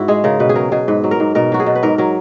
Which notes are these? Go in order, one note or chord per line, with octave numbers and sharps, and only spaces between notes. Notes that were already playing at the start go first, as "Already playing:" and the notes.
Already playing: G#2 E4 F#4
G#3 G#4
C#3 A#4
B2 B4
G#4
F#3 A#4
B2 G#4
G#2 B4
F#3
A#4
G#2
B2 A#4
F#3 F#4
G#4
B2
B4
G#2 A#4
F#3 A#4